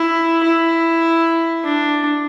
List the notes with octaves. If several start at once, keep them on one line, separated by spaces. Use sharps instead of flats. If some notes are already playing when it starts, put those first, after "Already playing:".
Already playing: E4
E4
D4